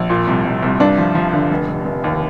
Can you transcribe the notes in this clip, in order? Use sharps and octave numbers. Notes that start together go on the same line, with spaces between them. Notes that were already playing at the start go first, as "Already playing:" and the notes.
Already playing: A#1
A#2
C2
C2
C2
G2 D4
F3
F3
D3
F1
F1
F1
D#2